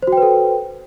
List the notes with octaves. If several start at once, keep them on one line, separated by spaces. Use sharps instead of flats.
F#4 A4 B4 C5 G5